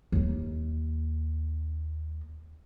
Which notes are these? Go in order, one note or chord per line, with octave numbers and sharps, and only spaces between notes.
D#2 D#4